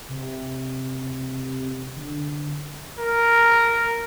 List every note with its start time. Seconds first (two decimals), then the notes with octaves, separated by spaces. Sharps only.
0.08 C3
1.96 D3
2.99 A#4